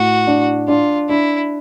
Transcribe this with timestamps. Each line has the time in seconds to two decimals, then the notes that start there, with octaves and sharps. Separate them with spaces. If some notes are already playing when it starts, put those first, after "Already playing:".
Already playing: A2 F#4
0.27 D4
0.68 D4 F4
1.09 D4 E4